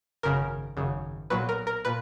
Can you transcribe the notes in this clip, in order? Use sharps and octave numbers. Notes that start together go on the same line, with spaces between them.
G#1 F#2 C#3 A#4
G#1 F#2 C#3
B1 A#2 F#3 B4
A#4
A#4
A#2 B4